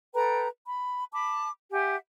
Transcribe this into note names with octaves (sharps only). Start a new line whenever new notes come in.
A4 B4 G5 A#5
B5
A5 B5 D6
G4 E5 F#5 G#5